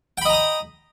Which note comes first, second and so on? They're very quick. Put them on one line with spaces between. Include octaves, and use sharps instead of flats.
G5 B5 D#5 A#5 D#6